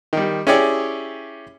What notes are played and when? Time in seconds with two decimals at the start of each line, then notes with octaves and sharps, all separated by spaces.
0.13 D#3 G3
0.47 C#4 E4 G4 G#4 C#5 D5